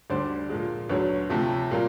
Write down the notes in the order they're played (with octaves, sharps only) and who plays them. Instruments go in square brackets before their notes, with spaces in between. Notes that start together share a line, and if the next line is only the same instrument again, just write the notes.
[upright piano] D2 D3 G3 C5 D5
A#2 F3 G#3
D2 D3 F#3 B4 C#5
D2 C3 F3 A3
A#2 G3 A#3